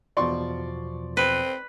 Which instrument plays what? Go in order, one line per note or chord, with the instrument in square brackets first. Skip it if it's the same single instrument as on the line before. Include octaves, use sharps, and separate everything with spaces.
[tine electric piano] E2 B2 F3 [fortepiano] D5 C6 C#6
[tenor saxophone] C4 [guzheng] B4